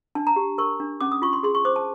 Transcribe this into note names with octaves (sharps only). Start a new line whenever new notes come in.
D4 A5
A#5
G4
A#4 C#6
D4
C#4 D6
D#6
F4 C#6
C6
G#4 C6
C#6
C5 D6
A5